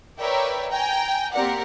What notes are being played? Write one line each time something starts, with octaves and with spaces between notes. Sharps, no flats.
A#4 B4 C#5 D5 E5 G5
G5 G#5 A#5
A#3 C4 G4 A#4 D5 F#5